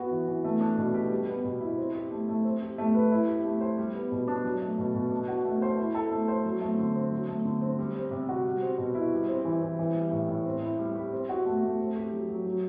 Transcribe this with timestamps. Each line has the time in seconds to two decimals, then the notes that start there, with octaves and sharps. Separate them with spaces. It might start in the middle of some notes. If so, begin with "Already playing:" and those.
Already playing: B3 F#4
0.11 E3
0.28 E3
0.44 A3
0.61 D4
0.77 B2
0.94 G4
1.12 G3
1.28 B3
1.44 B2
1.61 E4
1.78 C4
1.94 G4
2.11 A3
2.28 A3
2.44 C4
2.62 G4
2.78 A3
2.95 B4
3.11 E4
3.27 G4
3.44 A3
3.61 C5
3.78 G3
3.95 B3
4.12 B2
4.28 D4
4.44 F#3
4.62 A3
4.78 B2
4.95 B2
5.11 D4
5.28 F#4
5.45 A3
5.62 C5
5.79 E4
5.95 A4
6.12 A3
6.28 C5
6.45 F#3
6.61 A3
6.79 D3
6.95 C4
7.11 F#3
7.28 A3
7.45 D3
7.61 C4
7.79 G3
7.95 C4
8.11 C3
8.29 F#4
8.45 G3
8.62 C4
8.78 B2
8.95 E4
9.12 G3
9.28 C4
9.45 E3
9.61 E3
9.79 E3
9.95 G3
10.11 A2
10.28 A2
10.46 C4
10.62 E4
10.79 G3
10.95 G4
11.12 C4
11.29 F#4
11.46 A3
11.63 A3
11.79 C4
11.96 G4
12.12 F#3
12.29 F#3
12.45 F#3